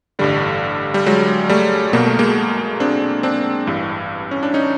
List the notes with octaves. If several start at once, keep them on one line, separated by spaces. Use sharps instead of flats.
A1 G2 D3 G3
G3
F#3 G#3
G3 A3
B1 B2 A#3
A3
G#3 A#3
C4 D4
C4 D4
A1 G2 E3
C#4
D4
C#4 D#4